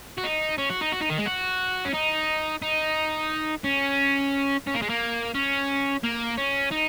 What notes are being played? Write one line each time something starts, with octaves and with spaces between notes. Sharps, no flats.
F#4
D#4
C#4
F#4
D#4
F#4
D#4
D#3
G#3
F#4
C#4
D#4
D#4
C#4
C#4
A#3
G#3
A#3
C#4
A#3
C#4
D#4